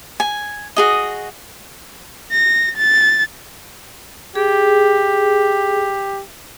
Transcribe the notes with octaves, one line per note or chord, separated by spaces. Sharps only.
G#5
F#4 G#4 D#5
A#6
A6
G4 G#4